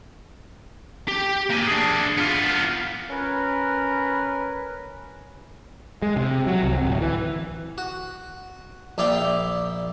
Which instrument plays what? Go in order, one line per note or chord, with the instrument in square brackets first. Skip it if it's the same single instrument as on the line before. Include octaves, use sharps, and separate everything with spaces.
[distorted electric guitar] G4
A#3 G#5
D4 G#4
B3 F4
[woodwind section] C#4 A#4 B4
[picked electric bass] G#3
C3
F#3
C2
D1
E3
[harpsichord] F#4
A#1 E4 D5 F5 G5